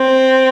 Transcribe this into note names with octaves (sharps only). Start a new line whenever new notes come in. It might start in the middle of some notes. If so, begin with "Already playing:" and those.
Already playing: C4